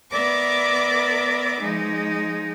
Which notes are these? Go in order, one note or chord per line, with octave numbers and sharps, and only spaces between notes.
B3 A#4 D5 E5 B5 D6
F3 G#3 D#4